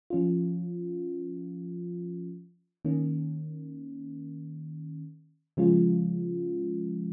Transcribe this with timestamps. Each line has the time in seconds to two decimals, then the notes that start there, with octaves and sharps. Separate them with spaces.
0.10 F3 C#4 F4
2.85 D#3 A#3 C#4
5.57 C#3 F3 G#3 C#4 F4